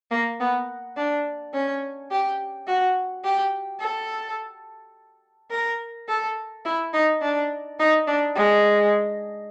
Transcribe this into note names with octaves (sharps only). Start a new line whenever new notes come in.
A#3
B3
D4
C#4
G4
F#4
G4
A4
A#4
A4
E4
D#4
D4
D#4
D4
G#3